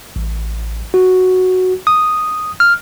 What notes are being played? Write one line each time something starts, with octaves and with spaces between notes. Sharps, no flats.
A1
F#4
D#6
F6